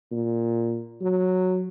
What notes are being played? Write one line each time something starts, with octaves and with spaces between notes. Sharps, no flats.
A#2
F#3